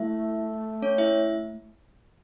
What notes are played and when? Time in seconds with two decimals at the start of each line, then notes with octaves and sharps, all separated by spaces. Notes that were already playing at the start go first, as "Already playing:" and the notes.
Already playing: A3 E4 E5
0.82 C#4 C#5
0.98 E4 E5